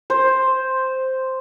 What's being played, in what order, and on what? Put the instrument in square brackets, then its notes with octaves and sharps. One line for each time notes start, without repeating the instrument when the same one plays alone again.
[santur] C5